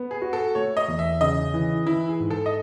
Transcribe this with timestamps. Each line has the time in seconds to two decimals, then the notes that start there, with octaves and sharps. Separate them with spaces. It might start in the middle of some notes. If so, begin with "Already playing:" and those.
Already playing: B3
0.11 G#4
0.22 F#4
0.33 A4
0.55 A3 C#5
0.77 D#5
0.88 E2
0.99 E5
1.21 C#3 D#5
1.54 E3
1.86 E3 E4
2.09 G#4
2.20 G#2
2.30 A4
2.46 D#5